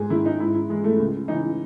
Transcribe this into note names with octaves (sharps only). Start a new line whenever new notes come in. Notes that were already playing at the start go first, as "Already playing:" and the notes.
Already playing: G#2 G#4
D#3 E4
D#4
G#2 E4
E4
E3 G#3
A3
C#2
C#3 E3 D#4